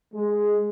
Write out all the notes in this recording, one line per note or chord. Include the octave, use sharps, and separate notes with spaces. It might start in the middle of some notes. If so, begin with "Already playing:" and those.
G#3